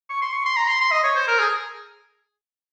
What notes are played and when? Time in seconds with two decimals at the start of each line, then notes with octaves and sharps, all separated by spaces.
0.10 C#6
0.22 C6
0.33 C#6
0.45 C6
0.57 A#5
0.68 C6
0.81 C6
0.92 D#5
1.04 C#5
1.15 C5
1.27 A#4
1.39 G#4